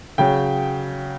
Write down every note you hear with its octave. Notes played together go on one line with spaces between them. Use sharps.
C#3 F#3 G5